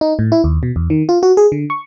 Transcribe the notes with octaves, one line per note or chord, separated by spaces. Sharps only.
D#4
A2
E4
D#2
B2
E2
D#3
F4
F#4
G#4
D3
C#6